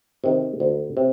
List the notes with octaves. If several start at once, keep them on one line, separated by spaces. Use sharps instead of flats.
C3 D#3
D2
C3